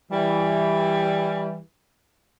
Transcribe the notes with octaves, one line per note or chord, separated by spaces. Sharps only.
E3 G3